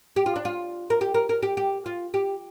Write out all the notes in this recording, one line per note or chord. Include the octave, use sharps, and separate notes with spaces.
G4
F4
D4
F4
A#4
G4
A#4
A#4
G4
G4
F4
G4